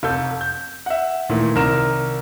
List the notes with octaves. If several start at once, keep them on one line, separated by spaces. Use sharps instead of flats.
F1 A4 G6
G6
E5 F#5
A#2 D#3 E3 A3
C2 D#3 A#4 E7